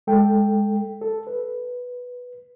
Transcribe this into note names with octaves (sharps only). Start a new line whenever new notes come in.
G#3 A4 G5
A4
B4